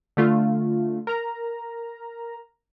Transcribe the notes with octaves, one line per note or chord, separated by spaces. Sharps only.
D3 A3 F4
A#4 A#5